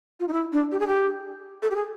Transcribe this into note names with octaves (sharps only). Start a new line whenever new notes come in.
F4
D#4
E4
D4
G4
G#4
G4
A4
G4
G#4